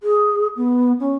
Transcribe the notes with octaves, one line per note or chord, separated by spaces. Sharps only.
G#4
B3
C#4